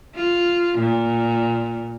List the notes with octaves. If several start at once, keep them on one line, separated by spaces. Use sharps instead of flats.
F4
A#2